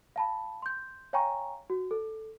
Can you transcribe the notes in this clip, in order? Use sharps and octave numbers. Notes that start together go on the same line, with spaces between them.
F5 A5 B5
C6 G6
C#5 F5 G5 G#5 A#5 C#6
F#4
A4